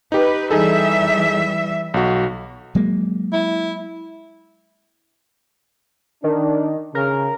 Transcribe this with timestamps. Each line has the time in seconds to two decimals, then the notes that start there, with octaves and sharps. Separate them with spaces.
0.12 D#4 G4 B4
0.51 E3 G3 D#4 G#4 A4 E5
1.94 B1 F#4
2.75 F#3 G#3 A#3
3.33 E4
6.24 D#3 D4
6.95 C#3 A#4